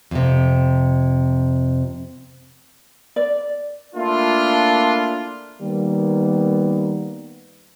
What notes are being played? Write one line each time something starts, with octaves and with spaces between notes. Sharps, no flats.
F2 C3
D5
A3 A#3 D4 E4 F4
D#3 G3 A#3 B3